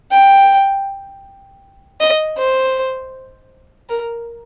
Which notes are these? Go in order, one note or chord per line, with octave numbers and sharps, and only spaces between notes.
G5
D#5
C5
A#4